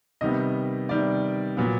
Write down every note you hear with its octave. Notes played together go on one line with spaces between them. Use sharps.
C3 D#3 G3 B3 D#5
C3 D#3 G3 B3 D5
A#2 F#3 B3